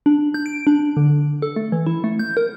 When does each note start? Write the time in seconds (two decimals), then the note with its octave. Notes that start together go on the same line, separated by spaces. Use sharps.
0.06 D4
0.34 G6
0.46 D7
0.67 D4
0.97 D3
1.42 A4
1.56 A3
1.72 E3
1.86 E4
2.04 A3
2.19 G6
2.37 A#4